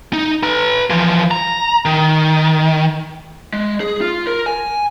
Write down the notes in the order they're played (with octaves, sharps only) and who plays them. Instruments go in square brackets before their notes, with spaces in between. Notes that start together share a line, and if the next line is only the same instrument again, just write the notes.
[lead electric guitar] D#4
B4 A#5
E3 F3
A#5
D#3
G#3
G#4
F4
A#4
G#5